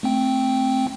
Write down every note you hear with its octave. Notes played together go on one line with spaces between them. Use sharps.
A3 C4 G5